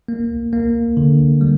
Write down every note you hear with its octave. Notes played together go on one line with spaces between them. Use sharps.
A#3
A#3
D3
G3